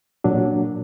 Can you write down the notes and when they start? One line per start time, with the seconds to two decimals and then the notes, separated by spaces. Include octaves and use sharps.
0.24 A#2 F#3 D4